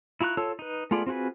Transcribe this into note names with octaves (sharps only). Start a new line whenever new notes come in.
E4 F4 A#5 C#6 F#6
F4 A4 C#5 A5 E6
D#4 B4
A3 B3 F4 G#4 D5
C4 F4 F#4 G#4 B4